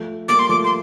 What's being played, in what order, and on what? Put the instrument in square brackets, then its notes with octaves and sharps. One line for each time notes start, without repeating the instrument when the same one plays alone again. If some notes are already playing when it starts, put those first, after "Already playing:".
Already playing: [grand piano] F3 A3
[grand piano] G3 A#3 [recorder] D6
[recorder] C6
[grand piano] F3 A3 [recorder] D6
[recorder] C6